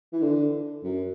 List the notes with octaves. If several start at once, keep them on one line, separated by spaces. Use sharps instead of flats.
E3
D3
F#2